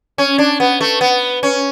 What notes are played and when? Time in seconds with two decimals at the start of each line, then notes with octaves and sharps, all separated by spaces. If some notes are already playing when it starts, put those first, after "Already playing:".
0.18 C#4
0.38 D4
0.60 B3
0.81 A3
1.01 B3
1.43 C#4